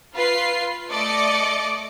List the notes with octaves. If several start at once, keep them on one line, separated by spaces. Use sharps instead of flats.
F4 B4 C7
A3 D5 D#5 D6 C#7